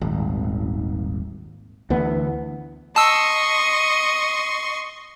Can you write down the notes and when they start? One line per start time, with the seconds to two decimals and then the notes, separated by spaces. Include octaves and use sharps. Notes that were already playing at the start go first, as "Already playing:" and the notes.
0.01 D#1 G#1
1.90 D2 E3 B3
2.96 D#5 A5 C6 C#6 E6